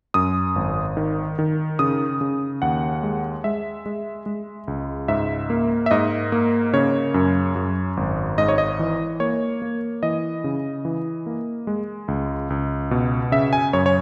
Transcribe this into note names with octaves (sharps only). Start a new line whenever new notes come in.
F#2 D#6
G#1
D#3
D#3
C#3 D#6
C#3
D#2 F#5
G#3
G#3 E5
G#3
G#3
C#2
G#2 E5
A#3
E5
G#2 D#5
A#3
C#3 C#5
F#2
F#2
G#1
G#2 D#5
C#5
D#5
E3
A#3 C#5
A#3
E3 D#5
C#3
E3
A#3
G#3
C#2
C#2
B2
C#3 E5
G#5
F#2 C#5
C#5